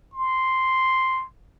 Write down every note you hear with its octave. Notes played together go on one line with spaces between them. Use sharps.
C6